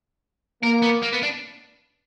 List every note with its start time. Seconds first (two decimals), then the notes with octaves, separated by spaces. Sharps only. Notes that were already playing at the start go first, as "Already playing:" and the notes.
0.62 A#3 A#4
0.82 B3
1.03 A#3
1.13 B3
1.23 D4